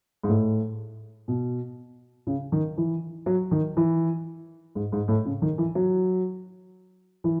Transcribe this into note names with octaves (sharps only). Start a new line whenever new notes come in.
G#2
A2
B2
C#3
D#3
E3
F#3
D#3
E3
G#2
G#2
A2
C#3
D#3
E3
F#3
E3